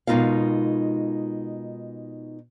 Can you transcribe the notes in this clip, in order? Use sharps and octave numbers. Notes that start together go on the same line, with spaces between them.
B2 G#3 D#4 F4 A#4 F5